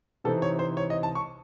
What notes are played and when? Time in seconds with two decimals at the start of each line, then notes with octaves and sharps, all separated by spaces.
0.24 C3 E3 C4 D#4 A4
0.42 C#5
0.59 C5
0.77 C#5
0.90 D#5
1.03 A5
1.15 C#6